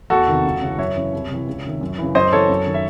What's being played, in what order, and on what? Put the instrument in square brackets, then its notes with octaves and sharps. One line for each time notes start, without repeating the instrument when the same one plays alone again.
[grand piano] E2 F#4 A4
C3 D#3
C#2
C#3 E3
F#2 C#5 E5
C#3 E3
C2
C3 E3
C#2
C3 D#3
F#2
C#3 E3
F#2 C5 D#5
C#3 E3 A4 C#5
F#2
D#3
E5